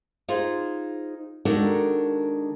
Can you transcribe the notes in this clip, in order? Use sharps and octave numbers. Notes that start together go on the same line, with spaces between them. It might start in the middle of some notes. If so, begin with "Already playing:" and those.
D#4 F4 G#4 C5
D#3 G#3 D4 F#4 A4 A#4